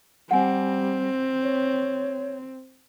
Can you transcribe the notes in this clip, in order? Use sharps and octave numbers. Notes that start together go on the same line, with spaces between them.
G3 C4 F#5 G#5
C#5